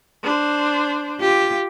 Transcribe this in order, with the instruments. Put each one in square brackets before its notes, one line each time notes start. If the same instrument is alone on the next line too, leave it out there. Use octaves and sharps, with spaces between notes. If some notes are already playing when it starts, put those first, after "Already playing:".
[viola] D4 C5
[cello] F4 G4